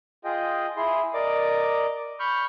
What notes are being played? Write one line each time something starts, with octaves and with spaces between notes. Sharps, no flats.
F4 G#4 D#5 G5
E4 G#4 C6
A#4 D5 D#5 D6
B5 C#6 F6 G6